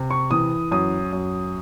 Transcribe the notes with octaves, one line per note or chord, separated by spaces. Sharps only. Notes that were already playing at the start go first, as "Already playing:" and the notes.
Already playing: C3
C#6
E3 D#6
F#2 D#6
F#2